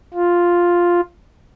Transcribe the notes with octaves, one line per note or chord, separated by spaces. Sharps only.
F4